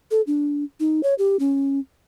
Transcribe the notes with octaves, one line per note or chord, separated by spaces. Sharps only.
A4
D4
D#4
C#5
G4
C#4